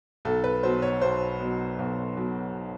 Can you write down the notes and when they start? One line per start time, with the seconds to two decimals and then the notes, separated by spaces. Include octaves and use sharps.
0.25 B1 A4
0.44 B4
0.63 B2 F#3 C5
0.82 C#5
1.01 B1 C5
1.40 B2 F#3
1.79 B1
2.17 B2 F#3